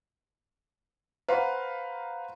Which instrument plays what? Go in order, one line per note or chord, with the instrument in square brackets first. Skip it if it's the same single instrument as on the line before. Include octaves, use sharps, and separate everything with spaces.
[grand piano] B4 C5 F5 F#5 A#5 C6